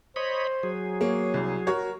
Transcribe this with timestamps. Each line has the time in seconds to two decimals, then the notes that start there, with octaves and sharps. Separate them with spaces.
0.16 C5 C#5 D#5 B5
0.63 F#3 G#4
1.01 A#3 C#5
1.34 C2
1.67 F#4 A#4 C#5